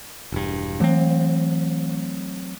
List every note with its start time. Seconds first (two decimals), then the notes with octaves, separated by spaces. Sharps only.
0.32 E1 G2
0.80 E3 F#3 A3 C4